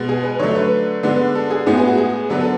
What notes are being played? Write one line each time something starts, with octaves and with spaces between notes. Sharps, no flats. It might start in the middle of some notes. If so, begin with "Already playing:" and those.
Already playing: B2 G#3 B3
G#4
B4
D3 F#3 A3 C#5
B4
D3 G#3 B3
A4
G#4
A2 G#3 B3 G#4
G#4
F#4
G#4
D3 F#3 B3 B4
A4